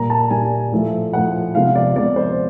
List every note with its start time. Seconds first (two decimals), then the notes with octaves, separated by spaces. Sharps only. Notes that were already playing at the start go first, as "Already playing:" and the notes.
Already playing: A#2 G3 A#3 A#5
0.10 A5
0.31 A#2 G3 A#3 G#5
0.72 A2 F3 A3
1.13 A2 F3 A3 F#5
1.55 C3 F3 G#3 B3 F5
1.76 D5
1.96 C3 F3 G#3 B3 D5
2.16 C5